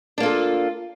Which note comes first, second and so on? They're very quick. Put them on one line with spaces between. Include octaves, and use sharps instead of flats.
D4 A#3 F4 A4